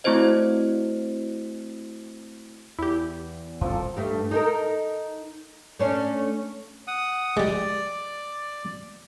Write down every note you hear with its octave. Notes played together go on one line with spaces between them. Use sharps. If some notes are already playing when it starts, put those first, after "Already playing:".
A3 C4 E4 F#4 C5 D#5
E2 E4 G4
D#1 C2 F#2 F3 A#3 A4
G2 A3
D#4 A4 A#4
A3 C#4 D4
F#5 D#6
G3 G#3 D5